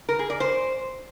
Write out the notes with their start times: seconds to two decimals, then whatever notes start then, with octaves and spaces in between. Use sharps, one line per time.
0.09 A#4
0.19 G#4
0.30 D5
0.40 C5